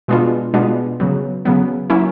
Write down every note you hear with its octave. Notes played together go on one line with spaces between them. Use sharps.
B2 G#3 B3 D4 F4
B2 G#3 B3 D4 F4
C#3 F#3 B3
C#3 F#3 B3
F#3 A#3 C#4 E4